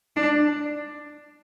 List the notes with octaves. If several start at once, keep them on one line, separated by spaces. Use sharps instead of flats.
D4